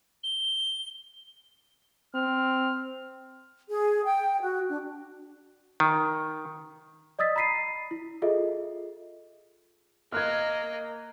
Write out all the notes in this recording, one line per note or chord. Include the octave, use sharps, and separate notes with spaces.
G7
C4 F6
G#4
G5
F#4
D4
D#3
D5 D#5 D#6 E6 A6 B6
A#5 B5 B6 C7 D#7
E4
F4 G#4 A4 D#5 E5
A#3 D#5 F6 F#6 G#6